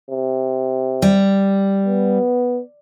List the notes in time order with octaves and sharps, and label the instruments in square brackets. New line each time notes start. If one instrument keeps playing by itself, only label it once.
[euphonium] C3
[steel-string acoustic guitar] G3
[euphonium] B3